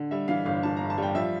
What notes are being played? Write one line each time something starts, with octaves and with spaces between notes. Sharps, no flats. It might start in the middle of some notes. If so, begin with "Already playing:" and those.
Already playing: D3
G3 E5
E3 F5
G1 F5
E3 A5
G2 A#5
A5
G3 G5
F3 E5